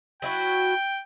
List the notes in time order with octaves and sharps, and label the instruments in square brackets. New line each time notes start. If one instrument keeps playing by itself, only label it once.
[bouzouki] F#3 E4 F#4 [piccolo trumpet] G5